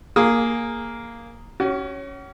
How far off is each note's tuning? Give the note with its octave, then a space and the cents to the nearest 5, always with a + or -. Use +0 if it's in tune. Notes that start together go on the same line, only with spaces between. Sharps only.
A#3 +0 G#4 +0
C#4 +0 F#4 +40